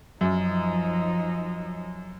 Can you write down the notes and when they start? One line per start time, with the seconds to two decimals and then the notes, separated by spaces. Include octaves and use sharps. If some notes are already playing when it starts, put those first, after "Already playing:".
0.21 F#2 F3 D#4